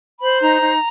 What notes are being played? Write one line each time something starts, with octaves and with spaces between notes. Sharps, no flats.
C5 B5
D#4 A#5
D#4